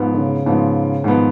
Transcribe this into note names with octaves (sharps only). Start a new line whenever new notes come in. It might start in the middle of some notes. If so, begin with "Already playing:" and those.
Already playing: G#2 F3 B3
D#3
C#3
G#2 F3 B3
G#2 D#3 F3 B3